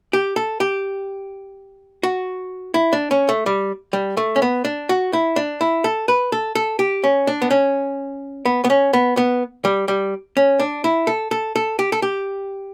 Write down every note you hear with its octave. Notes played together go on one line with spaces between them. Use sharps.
G4
A4
G4
F#4
E4
D4
C#4
A3
G3
G3
A3
C#4
B3
D4
F#4
E4
D4
E4
A4
B4
A4
A4
G4
C#4
D4
B3
C#4
B3
B3
C#4
B3
B3
G3
G3
C#4
D4
E4
A4
A4
A4
G4
A4
G4